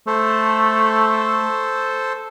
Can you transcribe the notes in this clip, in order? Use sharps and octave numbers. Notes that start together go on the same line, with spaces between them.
A3 A4 C5